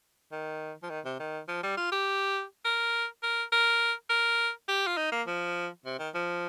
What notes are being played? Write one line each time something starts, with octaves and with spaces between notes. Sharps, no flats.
D#3
F3
D#3
C3
D#3
F3
G3
F4
G4
A#4
A#4
A#4
A#4
G4
F4
D#4
A#3
F3
C3
D#3
F3